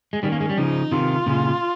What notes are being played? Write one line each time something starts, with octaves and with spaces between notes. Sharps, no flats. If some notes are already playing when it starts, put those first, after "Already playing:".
G#3
D#3 G3 C#4
A#3
G#3
G3
C#3 F3 D#4
C3 D#3 F4
A#2 C#3